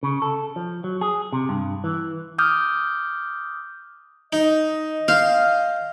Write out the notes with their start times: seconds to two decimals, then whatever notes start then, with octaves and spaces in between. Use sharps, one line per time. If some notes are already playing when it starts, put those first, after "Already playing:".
0.03 C#3
0.22 A4
0.56 F3
0.84 F#3
1.01 G#4
1.33 C3
1.49 G2
1.84 E3
2.38 D6 D#6 F6 G6
4.33 D#4 D#5
5.08 C5 F5